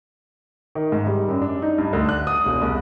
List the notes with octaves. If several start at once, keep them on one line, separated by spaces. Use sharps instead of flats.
D#3
G#2
G3
F#2
D4
D#4
G2
D2
F#6
D#6
E1
C2